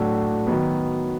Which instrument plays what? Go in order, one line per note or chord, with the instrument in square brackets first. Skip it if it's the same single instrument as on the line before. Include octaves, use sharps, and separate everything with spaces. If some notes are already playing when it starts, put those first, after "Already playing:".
Already playing: [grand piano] A2 F#3 A3 D4 F#4
D#3 F#3 B3